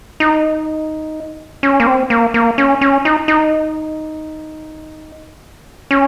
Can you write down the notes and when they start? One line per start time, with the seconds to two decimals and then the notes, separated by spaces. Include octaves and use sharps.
0.20 D#4
1.63 C#4
1.80 A#3
1.87 C4
2.10 A#3
2.34 A#3
2.58 C#4
2.81 C#4
3.05 D#4
3.28 D#4
5.91 C#4